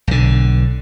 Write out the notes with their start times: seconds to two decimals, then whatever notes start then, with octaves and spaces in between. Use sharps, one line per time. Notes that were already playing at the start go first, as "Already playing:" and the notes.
0.07 B1 D3